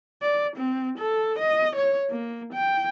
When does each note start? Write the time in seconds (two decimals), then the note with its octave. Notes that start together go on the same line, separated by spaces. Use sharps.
0.22 D5
0.57 C4
0.98 A4
1.39 D#5
1.76 C#5
2.10 A#3
2.53 G5